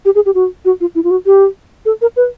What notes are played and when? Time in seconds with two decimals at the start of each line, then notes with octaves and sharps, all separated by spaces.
0.05 G4
0.15 G#4
0.26 G4
0.35 F#4
0.65 F#4
0.81 F4
0.95 E4
1.04 F4
1.11 F#4
1.26 G4
1.86 A4
2.02 A#4
2.16 B4